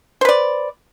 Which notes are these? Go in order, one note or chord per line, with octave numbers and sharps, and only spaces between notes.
B4 C5 D5